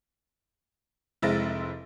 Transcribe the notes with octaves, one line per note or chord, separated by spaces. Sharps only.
F1 G#3 C4 E4 A6 A#6